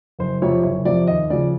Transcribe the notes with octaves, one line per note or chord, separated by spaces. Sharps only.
F#1 C5
F2 C3 F3 C#5
F#1 C#5
F2 C3 F3 D5
D#2 D#5
C#3 F3 D5